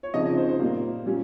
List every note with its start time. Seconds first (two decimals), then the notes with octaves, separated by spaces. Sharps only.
0.03 C#5
0.14 C#3 F3 C4 D#4 D#5
0.26 D#5
0.37 C5
0.49 C5
0.60 A#2 G3 A#3
1.06 A#2 G3 C#4